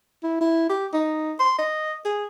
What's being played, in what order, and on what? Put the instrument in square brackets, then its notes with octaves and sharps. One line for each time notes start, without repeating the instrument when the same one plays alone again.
[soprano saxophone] E4
E4
G4
D#4
C6
D#5
G#4